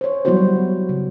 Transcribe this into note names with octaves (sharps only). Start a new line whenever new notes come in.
C5 C#5
F#3 G3 B3 E4 F#4 C5
C#3